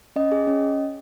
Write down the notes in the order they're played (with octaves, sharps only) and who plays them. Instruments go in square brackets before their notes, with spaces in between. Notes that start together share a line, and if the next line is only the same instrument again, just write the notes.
[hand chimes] C#4 D#5
G#4
C#4